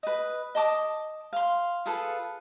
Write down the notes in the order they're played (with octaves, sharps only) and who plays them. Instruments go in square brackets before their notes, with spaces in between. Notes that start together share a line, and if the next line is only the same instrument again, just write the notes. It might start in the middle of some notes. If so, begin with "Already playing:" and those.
[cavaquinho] B4 D#5
D#5 A5 D6 D#6
F5 C6
F4 G#4 A4 B4